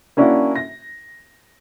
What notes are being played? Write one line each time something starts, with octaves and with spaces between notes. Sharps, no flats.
A#3 C#4 D4 E4 F#4
A#6